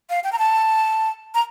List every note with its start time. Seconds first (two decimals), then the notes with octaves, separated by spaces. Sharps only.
0.10 F5
0.24 G5
0.32 A#5
0.39 A5
1.34 A#5